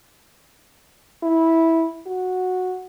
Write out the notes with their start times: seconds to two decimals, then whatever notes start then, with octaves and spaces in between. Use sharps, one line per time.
1.23 E4
2.07 F#4